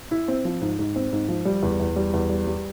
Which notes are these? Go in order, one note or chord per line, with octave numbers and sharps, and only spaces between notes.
E4
C4
F3
G#2
G#2
C4
G#2
F3
G3
E2
E2
G3
E2
G3
G3